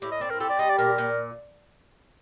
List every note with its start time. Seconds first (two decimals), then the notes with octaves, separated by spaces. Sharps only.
0.02 A2 G4
0.11 D#5
0.21 C4 D5
0.30 A#4
0.40 G4 A4
0.50 D5
0.59 G3 D#5
0.70 D5
0.79 A#2 A#4
0.98 A#2